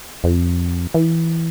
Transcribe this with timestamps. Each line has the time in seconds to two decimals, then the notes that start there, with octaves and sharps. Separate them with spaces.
0.24 F2
0.94 E3